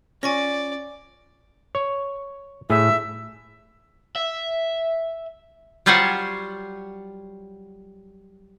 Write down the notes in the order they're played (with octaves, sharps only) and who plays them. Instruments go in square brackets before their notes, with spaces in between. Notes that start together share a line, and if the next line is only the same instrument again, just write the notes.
[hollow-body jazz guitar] C#4 F4 [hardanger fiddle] D5 [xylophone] G#5 C#6 A#6
[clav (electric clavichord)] C#5
[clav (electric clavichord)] A2 G#4 [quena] E5
[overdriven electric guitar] E5
[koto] F#3 G3 F4 C5 C#5 F#5